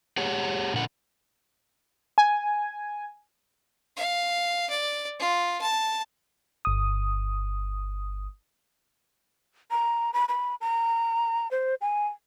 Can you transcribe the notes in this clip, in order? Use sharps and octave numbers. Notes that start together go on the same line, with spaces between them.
G4 G#4 C#5 F#5
A#2 D3 F#5
G#5
F5
D5
F4
A5
G1 D#6
A#5
B5
B5
A#5
C5
G#5